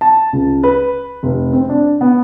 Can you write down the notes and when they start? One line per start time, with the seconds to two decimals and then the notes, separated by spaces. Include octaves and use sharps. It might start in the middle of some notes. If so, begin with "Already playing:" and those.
0.01 A5
0.33 C#2
0.63 B4
1.23 F1
1.53 C4
1.69 D4
2.01 B3